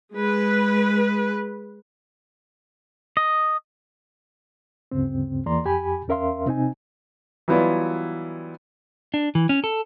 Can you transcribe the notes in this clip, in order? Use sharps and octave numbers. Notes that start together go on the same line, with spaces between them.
G#3 B4
D#5
D2 G2 C#3 C4
E2 E3 A#3 D5 A#5 C6
F2 G4 G#5 B5
E2 C#4 A#4 E5 F5 C6
C3 C4 D#4 G#5
E3 F#3 G3 B3 E4 F4
D4
E3
C#4
A4